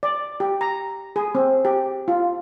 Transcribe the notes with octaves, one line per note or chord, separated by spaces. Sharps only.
D5
G4
A#5
G#4
C4
G4
F4